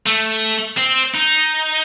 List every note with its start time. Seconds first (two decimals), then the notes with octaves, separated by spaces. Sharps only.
0.07 A3
0.77 C4
1.14 D#4